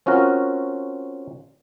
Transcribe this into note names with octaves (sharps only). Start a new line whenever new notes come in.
C4 C#4 F4 F#4 A#4